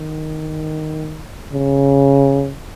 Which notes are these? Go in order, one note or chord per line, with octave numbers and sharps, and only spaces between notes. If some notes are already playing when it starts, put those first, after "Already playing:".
Already playing: D#3
C#3